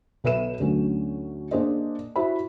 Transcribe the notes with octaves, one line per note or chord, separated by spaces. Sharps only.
B1 A4 B4 E5 D#7 E7
D2 D3 F#3 A3 C#4
A#3 D4 G#4 C5 D5 D#5
E4 F#4 C5 E5 B5